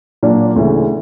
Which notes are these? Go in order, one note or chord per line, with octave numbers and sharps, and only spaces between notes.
A#2 F#3 A#3 D4
D2 C#3 E3